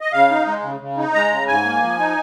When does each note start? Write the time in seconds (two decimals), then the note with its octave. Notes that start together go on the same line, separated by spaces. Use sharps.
0.01 D#5
0.13 C#3 F5
0.30 D#4
0.47 G#3
0.63 C#3
0.80 C#3
0.98 D#4
1.14 G#3 A#5
1.31 C#3
1.48 G#2 G#5
1.65 A#3
1.82 F3
1.99 D#4